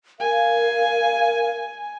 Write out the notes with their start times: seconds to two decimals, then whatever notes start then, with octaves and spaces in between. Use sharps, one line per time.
0.20 A#4 F5 G#5